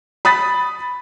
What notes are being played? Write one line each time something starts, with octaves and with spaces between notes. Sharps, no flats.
B5 D#6 A6 B6